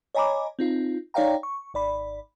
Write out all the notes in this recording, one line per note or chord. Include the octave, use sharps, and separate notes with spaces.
C#5 D#5 G#5 A#5 B5 D6
C4 D#4 F4
D#4 C#5 D5 F5 G5 A#5
C#6
G#1 D5 B5